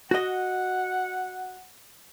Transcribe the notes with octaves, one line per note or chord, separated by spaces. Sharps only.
F#4 D#5 F#5